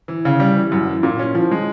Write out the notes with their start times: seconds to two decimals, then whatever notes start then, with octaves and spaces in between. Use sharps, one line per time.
0.08 E3
0.25 C#3
0.40 G3
0.57 E3
0.72 F#2
0.88 E3
1.03 A#2
1.19 C#4
1.35 F3
1.51 G#3